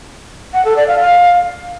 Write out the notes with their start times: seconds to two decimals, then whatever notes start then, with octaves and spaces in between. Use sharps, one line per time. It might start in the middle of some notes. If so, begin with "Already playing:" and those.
0.54 F#5
0.65 A4
0.76 D5
0.88 F5
0.99 F5